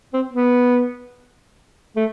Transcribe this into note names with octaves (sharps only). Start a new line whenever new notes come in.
C4
B3
A3